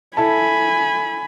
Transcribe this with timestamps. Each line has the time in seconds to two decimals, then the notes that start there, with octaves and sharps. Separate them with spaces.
0.17 E4 A4 G#5 A5 B5